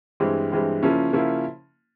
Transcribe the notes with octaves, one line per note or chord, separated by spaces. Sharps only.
G2 E3 G#3 C4
G2 E3 G#3 C4
C#3 F3 A#3 C#4 E4
C#3 F3 A#3 C#4 E4